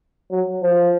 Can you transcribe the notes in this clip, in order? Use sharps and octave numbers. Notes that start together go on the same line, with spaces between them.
F#3
F3